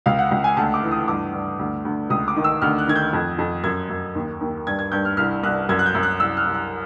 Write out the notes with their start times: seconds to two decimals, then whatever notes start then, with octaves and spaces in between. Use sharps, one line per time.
0.06 C#2 F5
0.19 F#5
0.31 C#2
0.44 G#5
0.57 D2 A5
0.74 D6
0.83 E3
0.91 D#6
1.08 G2 D6
1.33 G2
1.59 D2
1.85 D2
2.10 C#2 D#6
2.28 D6
2.36 D#3
2.44 E6
2.61 D2 F6
2.78 F#6
2.88 D#3 G#6
2.96 G6
3.13 F2
3.38 F2
3.63 F#2 G#6
3.90 F#2
4.15 D#2
4.41 D#2
4.67 G2 G#6
4.79 G#6
4.92 G2 G6
5.05 F6
5.17 C2 F6
5.43 C2 F#6
5.69 F#2 G#6
5.79 F#6
5.86 G6
5.95 F#2
6.03 F#6
6.20 C2 E6
6.37 F6
6.46 C2
6.54 F#6